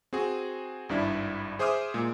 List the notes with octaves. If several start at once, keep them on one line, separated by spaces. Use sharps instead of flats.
C4 F#4 G#4
G#1 G2 D4 E4
G#4 C5 E5 D6 D#6 F6
A#2 G#3